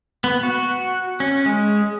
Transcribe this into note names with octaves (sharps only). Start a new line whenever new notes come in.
B3
F#4
C#4
G#3